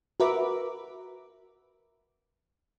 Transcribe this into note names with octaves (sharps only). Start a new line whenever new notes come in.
F#4 A#4 B4 E5 D6